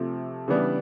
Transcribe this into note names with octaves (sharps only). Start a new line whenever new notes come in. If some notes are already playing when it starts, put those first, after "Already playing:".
Already playing: C3 F3 A3
C#3 E3 G3 B3 D4